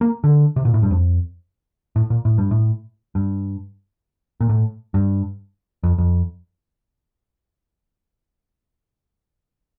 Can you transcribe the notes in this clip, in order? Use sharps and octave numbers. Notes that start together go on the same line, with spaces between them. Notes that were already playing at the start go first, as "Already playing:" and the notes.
A#3
D3
C3
A#2
A2
G2
F2
A2
A#2
A2
G2
A2
G2
A#2
A2
G2
F2
F2